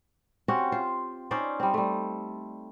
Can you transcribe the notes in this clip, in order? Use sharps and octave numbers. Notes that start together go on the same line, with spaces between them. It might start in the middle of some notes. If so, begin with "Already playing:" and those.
C4 C#4 F#4 G4
F4 C5
C#4 D#4 C5 D5
G3 C4
G3 A3